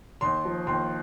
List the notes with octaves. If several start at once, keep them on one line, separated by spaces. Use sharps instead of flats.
D#2 C6
F3
D#2 C6